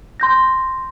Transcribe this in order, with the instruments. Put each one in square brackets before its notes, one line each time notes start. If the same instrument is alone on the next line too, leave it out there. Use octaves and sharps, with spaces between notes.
[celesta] C6 G6 A#6